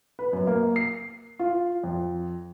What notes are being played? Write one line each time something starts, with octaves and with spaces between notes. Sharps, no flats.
B4
F#2
A#3
C7
F4
F2